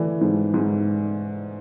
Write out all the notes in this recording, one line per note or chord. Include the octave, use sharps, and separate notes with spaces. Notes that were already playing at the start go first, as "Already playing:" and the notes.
Already playing: E3 A3 D5
G#2
G#2